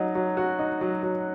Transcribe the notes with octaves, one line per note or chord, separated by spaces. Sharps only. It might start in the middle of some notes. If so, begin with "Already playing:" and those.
Already playing: F#3 D#4 F#4
F#3
F#4
D#4
F#3
F#3